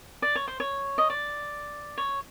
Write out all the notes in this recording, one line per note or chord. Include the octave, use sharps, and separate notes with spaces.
D5
C#5
C5
C#5
D#5
D5
C#5